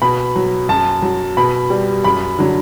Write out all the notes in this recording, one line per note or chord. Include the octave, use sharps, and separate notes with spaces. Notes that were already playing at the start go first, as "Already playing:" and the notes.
B2 B5
F#3
F#2 A5
F#3
B2 B5
G3
F#2 B5
D3 F#3